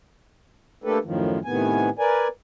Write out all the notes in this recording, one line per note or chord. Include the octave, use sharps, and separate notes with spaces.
A3 A#3 D4 G4 A4 B4
F#2 A2 D#3 F3
A2 C3 D#3 B3 G#5
A#4 B4 D5 G#5